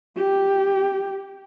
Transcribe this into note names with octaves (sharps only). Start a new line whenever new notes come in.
G4